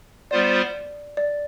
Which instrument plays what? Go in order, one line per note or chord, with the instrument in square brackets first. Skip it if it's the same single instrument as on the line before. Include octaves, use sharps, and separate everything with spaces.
[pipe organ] G3 B3 F4 C5 [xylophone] D5
[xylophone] D5